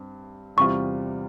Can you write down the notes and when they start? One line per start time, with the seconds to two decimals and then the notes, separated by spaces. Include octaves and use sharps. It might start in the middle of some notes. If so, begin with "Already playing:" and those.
Already playing: G2 C4
0.56 E2 C3 G3 C4 F4 C#6